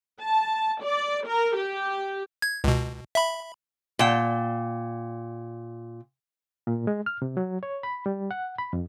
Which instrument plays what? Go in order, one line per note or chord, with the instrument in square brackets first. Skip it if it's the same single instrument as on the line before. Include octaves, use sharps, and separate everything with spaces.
[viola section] A5
D5
A#4
G4
[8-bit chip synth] G#6
C#2 B2
E5 B5
[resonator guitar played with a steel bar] A#2 G5
[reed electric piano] A#2
G#3
F6
C3
F#3
C#5
B5
G3
F#5
B5
F2